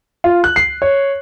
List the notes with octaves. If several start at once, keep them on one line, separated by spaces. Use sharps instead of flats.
F4
F#6
C7
C#5